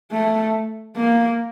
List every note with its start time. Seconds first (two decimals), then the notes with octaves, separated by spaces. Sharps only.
0.12 A3
0.96 A#3